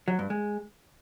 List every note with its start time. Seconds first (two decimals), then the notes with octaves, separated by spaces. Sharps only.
0.08 F#3
0.19 G2
0.30 G#3